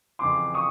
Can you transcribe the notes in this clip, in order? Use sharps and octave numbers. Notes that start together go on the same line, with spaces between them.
F2 C#3 E3 C6 D6
C#6 D#6